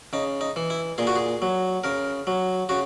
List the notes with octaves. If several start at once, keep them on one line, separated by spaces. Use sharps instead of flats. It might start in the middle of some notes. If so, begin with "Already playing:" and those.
C#3 D#4
D#4
E3
E4
A#2 G#4
F#4
G#4
F#3
C#3 A#4
F#3
C#3 F#4